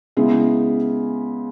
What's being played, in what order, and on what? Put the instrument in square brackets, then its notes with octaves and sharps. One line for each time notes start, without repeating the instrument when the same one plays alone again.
[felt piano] C#3 G#3 B3 E4